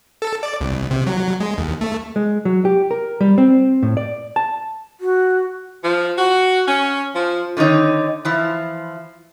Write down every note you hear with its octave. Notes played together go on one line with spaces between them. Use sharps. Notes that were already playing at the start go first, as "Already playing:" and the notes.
A4
D5
C2
C3
F#3
G#3
D#2
A3
G#3
F#3
G4
A#4
G3
C4
A2
D5
A5
F#4
F3
F#4
C#4
F3
D3 D#3 C4 D#4 C#5
E3 F3 E4